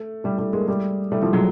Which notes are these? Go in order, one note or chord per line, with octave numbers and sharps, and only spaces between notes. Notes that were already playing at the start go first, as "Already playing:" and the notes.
Already playing: A3
G3 A3
G3 A3
G#3 A#3
G3 A3
G3 A3
F3 G3
F#3 G#3